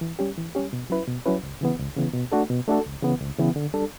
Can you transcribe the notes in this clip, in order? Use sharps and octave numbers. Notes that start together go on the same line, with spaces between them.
E3
G3 C#4 G4
E3
G3 C#4 G4
B2
F#3 C#4 E4 B4
B2
F#3 C#4 E4 B4
C#2
C#3 E3 B3
C#2
C#3 E3 B3
B2
A3 D4 F#4 A4
B2
A3 D4 F#4 A4
C#2
C#3 E3 B3
C#2
C#3 E3 B3
D3
G3 D4 A4